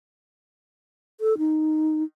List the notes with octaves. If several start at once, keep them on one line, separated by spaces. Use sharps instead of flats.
A4
D#4